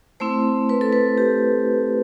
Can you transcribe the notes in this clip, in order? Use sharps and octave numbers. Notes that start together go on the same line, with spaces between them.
A3 C4 E4 C5
B4
A4
B4
G4